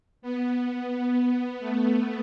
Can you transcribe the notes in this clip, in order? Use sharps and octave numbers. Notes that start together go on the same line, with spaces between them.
B3
B3
A3